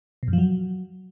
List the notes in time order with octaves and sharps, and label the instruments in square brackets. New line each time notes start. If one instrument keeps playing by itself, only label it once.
[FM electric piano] B2
F#2
F3
F#3